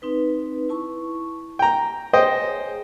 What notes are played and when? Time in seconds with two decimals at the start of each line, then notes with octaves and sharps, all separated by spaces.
0.02 C4 D#4 B4
0.69 E4 A5 C#6
1.59 G5 G#5 A#5
2.13 G#4 C5 C#5 D#5 G5 G#5